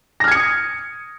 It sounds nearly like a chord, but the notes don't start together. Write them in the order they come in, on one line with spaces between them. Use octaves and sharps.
A#6 F6 G#6 C#7 D#6